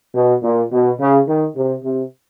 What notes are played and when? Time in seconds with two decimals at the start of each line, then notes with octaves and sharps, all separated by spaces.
0.15 B2
0.43 A#2
0.71 B2
1.00 C#3
1.27 D#3
1.55 C3
1.83 C3